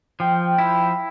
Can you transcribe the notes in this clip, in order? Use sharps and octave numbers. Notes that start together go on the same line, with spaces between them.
F3 G5
E4